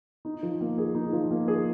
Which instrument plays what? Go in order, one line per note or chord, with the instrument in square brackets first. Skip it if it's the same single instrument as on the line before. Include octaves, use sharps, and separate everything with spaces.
[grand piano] D#4
F3
A#3
G#4
D#4
F3
A#3
G#4